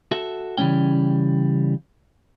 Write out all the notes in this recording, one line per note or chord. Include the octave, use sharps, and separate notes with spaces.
F#4 A4 E5
C#3 E3 G3 G#3 C#4 G5